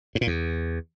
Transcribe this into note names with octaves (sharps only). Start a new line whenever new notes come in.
G#2
A#2
E2